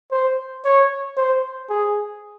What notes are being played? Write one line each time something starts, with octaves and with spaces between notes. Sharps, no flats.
C5
C#5
C5
G#4